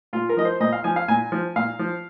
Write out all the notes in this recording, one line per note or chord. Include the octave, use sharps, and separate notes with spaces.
A#2 F4
A#4
F3 D#5
C5
A#2 D#5
F5
F3 G#5
F5
A#2 G#5
F3
A#2 F5
F3